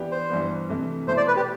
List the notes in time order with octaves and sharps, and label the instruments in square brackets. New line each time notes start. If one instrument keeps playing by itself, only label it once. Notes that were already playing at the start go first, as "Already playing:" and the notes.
Already playing: [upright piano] E3 B3 D4 G4
[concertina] C5
[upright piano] G2 E3 G3 B3
C3 E3 A3
[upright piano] B2 A3 E4 [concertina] C5
[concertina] D5
B4
G4